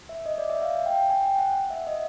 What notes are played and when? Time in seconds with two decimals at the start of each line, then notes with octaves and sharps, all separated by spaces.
0.09 E5
0.26 D#5
0.38 D5
0.50 E5
0.62 F5
0.86 G5
0.98 G5
1.10 G#5
1.22 G5
1.38 F#5
1.70 E5
1.87 D#5